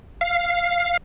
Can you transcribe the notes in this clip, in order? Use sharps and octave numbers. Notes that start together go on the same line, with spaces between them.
F5